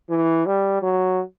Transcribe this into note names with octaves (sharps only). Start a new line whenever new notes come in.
E3
G3
F#3